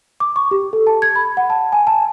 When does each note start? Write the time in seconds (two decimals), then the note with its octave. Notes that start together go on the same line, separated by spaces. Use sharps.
0.20 D6
0.36 C#6
0.51 G4
0.73 A4
0.87 A5
1.02 G#6
1.16 B5
1.37 F#5
1.50 A5
1.72 G#5
1.87 A5